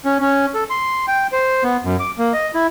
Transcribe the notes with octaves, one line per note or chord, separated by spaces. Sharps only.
C#4
C#4
A4
C6
G5
C5
B3
F#2
D6
A#3
D#5
E4